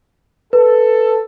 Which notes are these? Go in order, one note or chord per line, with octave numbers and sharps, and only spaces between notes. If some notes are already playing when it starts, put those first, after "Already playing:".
A4 B4